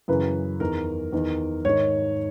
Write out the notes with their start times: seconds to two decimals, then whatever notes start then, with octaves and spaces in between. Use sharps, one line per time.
0.08 F#2 C#3 E3 B4
0.60 E2 D#3 A#4
1.13 E2 D#3
1.65 G#2 D#3 C#5